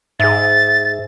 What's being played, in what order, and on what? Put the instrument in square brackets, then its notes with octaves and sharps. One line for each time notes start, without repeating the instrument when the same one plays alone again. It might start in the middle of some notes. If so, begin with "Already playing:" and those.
[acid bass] G#2 [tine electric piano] G#4 E5 [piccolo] A6